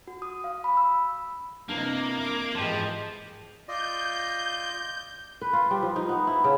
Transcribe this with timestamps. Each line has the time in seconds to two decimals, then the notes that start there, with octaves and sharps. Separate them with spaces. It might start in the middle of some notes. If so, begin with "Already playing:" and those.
0.07 F#4
0.22 D#6
0.44 F5
0.64 B5
0.77 E6
1.69 C3 E3 A#3 D4 D#4 B4
2.18 E4 D6
2.55 G#2 E3 F3 G4 D#5 A5
3.68 F4 D5 D#5 G6
5.42 B4
5.53 F4
5.71 G3
5.83 F3
5.96 D#4
6.09 B3
6.27 E4
6.44 C#3